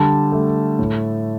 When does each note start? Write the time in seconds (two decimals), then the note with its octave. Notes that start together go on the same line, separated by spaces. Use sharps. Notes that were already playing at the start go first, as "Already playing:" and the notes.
Already playing: D3 G3 A5
0.32 A3
0.79 A2